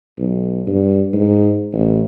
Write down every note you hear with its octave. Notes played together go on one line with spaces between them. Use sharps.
B1
G2
G#2
A1